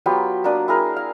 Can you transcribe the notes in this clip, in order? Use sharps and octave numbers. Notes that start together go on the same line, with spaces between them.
F#3 B3 F4 G4
A#3 D4 D#6
E4 G#4 A#4
F5